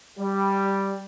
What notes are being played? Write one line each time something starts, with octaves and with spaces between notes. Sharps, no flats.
G3